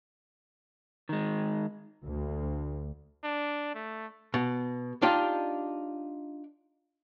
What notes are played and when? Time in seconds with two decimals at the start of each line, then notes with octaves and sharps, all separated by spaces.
1.09 D#3 G#3
2.05 D2
3.24 D4
3.75 A3
4.34 B2
5.02 D4 D#4 F4 G4